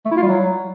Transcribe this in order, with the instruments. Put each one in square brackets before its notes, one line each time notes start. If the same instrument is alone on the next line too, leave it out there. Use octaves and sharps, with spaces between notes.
[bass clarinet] A3
E4
F4
G3
F#3